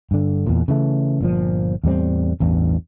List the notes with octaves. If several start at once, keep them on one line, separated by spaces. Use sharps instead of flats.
G2 D3
E2 A#2
C#3 E3 A3
G1 A#2 F3
E2 A2 G3 C4
A1 E2 G2